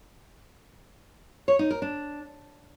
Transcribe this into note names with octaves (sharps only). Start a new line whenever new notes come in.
C#5
D#4
A#4
D4